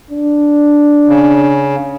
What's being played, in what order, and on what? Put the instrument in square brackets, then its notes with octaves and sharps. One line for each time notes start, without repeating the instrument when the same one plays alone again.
[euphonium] D4
[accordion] C#3